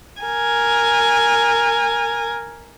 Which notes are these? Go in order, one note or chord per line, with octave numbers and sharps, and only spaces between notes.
A#4 G#5